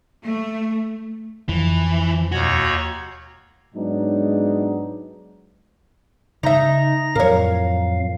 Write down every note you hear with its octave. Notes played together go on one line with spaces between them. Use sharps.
A3
F2 E3 F3
D#2 B2 F#4 C#5
G#2 F#3 G#3 B3 D4 D#4
C#3 D#4 E5 A#5 A#6
F2 A2 F3 F#3 A#4 C#5 F5